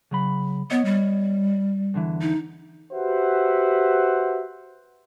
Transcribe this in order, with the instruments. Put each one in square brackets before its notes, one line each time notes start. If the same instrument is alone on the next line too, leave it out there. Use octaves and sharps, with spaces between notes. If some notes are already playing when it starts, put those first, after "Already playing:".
[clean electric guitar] C#3 F#3 B5
[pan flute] B3 [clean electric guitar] C#5 D#5
[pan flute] G3
[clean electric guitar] E2 D3 E3
[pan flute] D#4
[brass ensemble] F#4 G4 B4 C5 E5 F#5